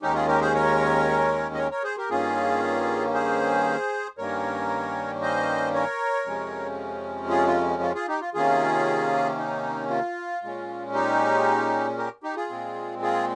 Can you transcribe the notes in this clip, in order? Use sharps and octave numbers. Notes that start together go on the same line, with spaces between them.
D#2 D#3 G#3 C#4 D#4 G4
F4 G#4
G4 A#4
G#4 C5
A#4 C#5
D#5
A#4 C#5
A#4 C#5
G#4 C5
G4 A#4
G2 D#3 A#3 C#4 F4 G#4
G#4 C5
G2 D#3 G3 A#3 C#4 A#4 C#5
C5 D#5
A#4 C#5
F2 C3 F3 G#3 C#4
F4 G#4
F4
F4
F4 G#4
D#4 G4
F4
C3 D#3 A#3 C#4 F4 G#4
D#4
F4
A#2 G#3 C#4
D#4 G4
G4 A#4
D#4 G4
F4 G#4
A#2 G#3 C4
F4 G#4